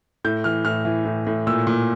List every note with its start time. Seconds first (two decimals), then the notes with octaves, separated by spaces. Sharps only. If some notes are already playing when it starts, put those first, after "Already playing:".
0.24 A2 G6
0.44 E3 F6
0.65 A2 F6
0.85 E3
1.05 A2
1.27 A2
1.47 A#2 E6
1.67 A#2